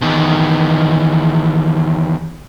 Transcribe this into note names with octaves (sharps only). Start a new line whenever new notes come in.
E2 D#3